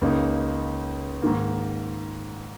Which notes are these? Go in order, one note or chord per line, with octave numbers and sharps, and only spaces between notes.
C#2 C#3 A#3 D#4
G#2 D#3 A#3